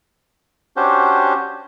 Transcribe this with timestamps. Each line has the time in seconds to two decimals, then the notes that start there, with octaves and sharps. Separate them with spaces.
0.77 C#4 D4 F#4 G4 C5